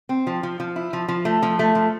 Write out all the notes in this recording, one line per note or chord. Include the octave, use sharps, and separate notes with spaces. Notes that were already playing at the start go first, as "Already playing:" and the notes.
C4
F3
F3
F3
E4
F3
F3
A3
F3
A3
F3